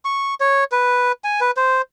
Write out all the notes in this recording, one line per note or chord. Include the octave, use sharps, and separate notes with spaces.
C#6
C#5
B4
G#5
B4
C5